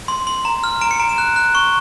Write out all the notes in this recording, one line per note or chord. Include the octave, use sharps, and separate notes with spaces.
C6
C6
A#5
F6
A#5 D7
C#7
A#5 D7
E7
F#6
F#6
C#6